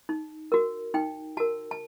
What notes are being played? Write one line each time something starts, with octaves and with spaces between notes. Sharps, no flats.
D#4
F#4 A#4
D#4 G5
F#4 A#4 A5
A5